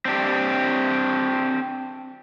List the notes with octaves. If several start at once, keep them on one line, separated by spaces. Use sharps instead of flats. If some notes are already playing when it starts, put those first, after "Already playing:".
C4 D4 G4